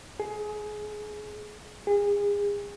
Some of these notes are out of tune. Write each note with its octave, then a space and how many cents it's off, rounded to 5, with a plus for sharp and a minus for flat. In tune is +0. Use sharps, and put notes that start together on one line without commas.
G#4 +20
G#4 -35